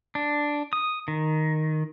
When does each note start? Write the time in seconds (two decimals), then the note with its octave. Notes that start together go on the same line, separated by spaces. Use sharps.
0.15 D4
0.73 D#6
1.08 D#3